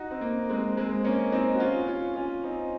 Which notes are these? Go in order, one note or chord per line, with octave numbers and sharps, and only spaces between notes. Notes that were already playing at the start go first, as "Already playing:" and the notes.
Already playing: D#4 F#4
C4
A#3
G#3 C4
G#3 C4
A#3 C#4
C4 D#4
F#4
C#4 F4
C#4 F4
C#4 F4
C4 D#4